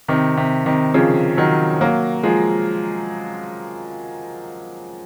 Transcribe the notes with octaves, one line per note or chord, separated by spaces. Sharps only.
C3 D#3
C3
C3 D#3
C#3 F3
D#3 F#3
F#3 A#3
F3 G#3